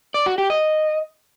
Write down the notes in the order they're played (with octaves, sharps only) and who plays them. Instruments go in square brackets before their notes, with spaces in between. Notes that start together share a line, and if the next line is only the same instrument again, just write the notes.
[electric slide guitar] D5
F#4
G4
D#5